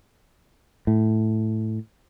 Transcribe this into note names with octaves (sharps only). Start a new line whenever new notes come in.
A2